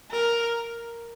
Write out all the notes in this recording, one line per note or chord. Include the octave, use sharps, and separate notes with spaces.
A#4